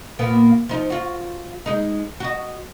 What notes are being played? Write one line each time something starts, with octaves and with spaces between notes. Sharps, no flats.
A#2 A#3 B3
F3 D#4
F4 F#4
G#3 D#4
F#4 D#5